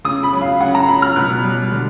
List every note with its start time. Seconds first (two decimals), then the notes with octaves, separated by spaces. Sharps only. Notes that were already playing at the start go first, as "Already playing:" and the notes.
0.05 C#3 D#6
0.23 B5
0.33 F#3
0.42 F5
0.60 C#3 F#5
0.75 A#5
0.88 F#3 B5
1.02 F6
1.16 B2 F#6
1.44 G3
1.72 D3